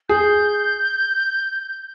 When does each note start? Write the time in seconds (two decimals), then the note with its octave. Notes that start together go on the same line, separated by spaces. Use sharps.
0.09 G#4 G6